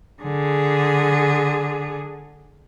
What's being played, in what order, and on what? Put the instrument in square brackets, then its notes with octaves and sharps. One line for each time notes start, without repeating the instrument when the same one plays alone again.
[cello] D3 G#4